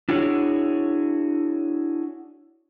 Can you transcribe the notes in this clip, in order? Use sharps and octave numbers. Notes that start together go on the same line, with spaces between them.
D4 E4 F#4 G#4 C#5